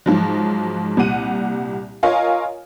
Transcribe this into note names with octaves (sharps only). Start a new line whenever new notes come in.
G#2 F3 F#3
C2 A#2 G3 F#5 D#7
F4 A#4 C#5 D#5 F5 G#5